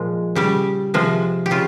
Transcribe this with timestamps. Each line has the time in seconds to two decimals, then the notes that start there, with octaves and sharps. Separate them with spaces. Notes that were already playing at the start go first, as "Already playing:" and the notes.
Already playing: A#2 F3 G#3
0.35 C#3 G3 G4
0.94 C3 F3 G#3
1.46 G4
1.51 C#3 F4